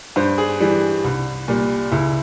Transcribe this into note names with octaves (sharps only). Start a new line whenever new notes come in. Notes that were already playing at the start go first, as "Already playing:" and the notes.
G2 C5
G#4
E3 G3
C2
A#2 G3
C#2 E4